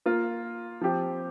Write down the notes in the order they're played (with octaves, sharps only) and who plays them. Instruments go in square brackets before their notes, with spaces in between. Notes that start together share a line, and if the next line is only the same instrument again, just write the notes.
[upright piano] A#3 F4 A#4
F3 C4 G4